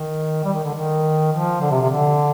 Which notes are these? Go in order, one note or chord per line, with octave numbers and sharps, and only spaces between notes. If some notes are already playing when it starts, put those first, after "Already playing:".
Already playing: D#3
G3
D#3
D3
D#3
F3
D3
C3
C3
D3